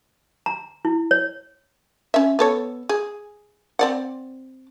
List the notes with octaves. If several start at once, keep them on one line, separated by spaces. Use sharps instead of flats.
A#5
E4
C#5
C#4 E5
B3 A4 C#5
G#4
C4 D5 F#5